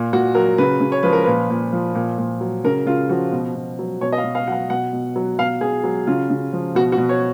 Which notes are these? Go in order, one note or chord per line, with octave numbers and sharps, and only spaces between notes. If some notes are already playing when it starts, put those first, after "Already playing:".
Already playing: A#2
A#2 F#4
F#3 A#4
C#3 B4
C#3
C#5
F3 B4
A#4
A#2 B4
A#2
F3
A#2
A#2
F#3
C#3 A#4
C#3 F4
F3 F#4
B2
B2
F#3
B2 C#5
D#5
F5
B2
F5
F#3 F5 F#5
B2 F#5
B2
F#3
B2 F5
B2 G#4
F#3
C#3 F4
C#3
F3
B2 F#4
F#4
B2
C#5